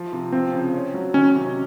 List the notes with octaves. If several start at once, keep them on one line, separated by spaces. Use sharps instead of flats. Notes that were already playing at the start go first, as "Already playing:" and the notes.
Already playing: F3
C3
F3 C4
C#3
C#4
F#3
D#3 C#4
C3